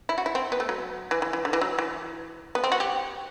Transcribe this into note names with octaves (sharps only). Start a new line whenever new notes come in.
E4
F#4
E4
C4
B3
A3
F#3
E3
E3
E3
D3
E3
F#3
E3
B3
C4
F#4
G4